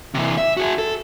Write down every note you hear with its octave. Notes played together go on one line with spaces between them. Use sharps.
C3 E3
E5
F#4 G#4
A4